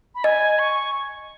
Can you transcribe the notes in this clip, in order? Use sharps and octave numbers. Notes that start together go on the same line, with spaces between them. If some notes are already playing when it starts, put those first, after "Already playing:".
B5
D#5 G#5
C#6